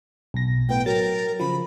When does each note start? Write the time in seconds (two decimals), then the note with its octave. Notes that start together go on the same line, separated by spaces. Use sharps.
0.34 B1 A#6
0.69 A2 B3 G5
0.86 F#3 A#4 A6
1.40 C#3 F3 B5